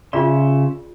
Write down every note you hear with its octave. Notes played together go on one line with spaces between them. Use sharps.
C#3 F4 G#4 D5 E5 C6